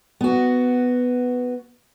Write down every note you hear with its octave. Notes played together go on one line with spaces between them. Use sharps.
B3 F#4